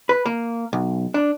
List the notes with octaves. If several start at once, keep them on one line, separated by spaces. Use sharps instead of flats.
B4
A#3
B1
D4